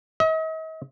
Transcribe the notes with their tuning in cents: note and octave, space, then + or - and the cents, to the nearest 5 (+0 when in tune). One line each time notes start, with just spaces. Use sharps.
D#5 +45